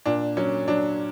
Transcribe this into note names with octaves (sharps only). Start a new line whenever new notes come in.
A#2 D4
F#3 C#4
F#3 D4